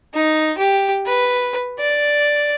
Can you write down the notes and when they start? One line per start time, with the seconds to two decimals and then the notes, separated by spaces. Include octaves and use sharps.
0.14 D#4
0.58 G4
1.06 B4
1.79 D5